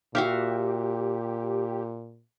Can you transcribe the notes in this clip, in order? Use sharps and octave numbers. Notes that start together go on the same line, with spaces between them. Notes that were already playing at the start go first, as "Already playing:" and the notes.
A#2 F#4 G4 E5 F5